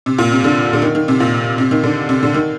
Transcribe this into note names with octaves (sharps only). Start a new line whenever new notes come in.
C3
A#2
C3
D3
D3
D#3
D#3
C3
A#2
C3
D#3
D3
C3
D3
D#3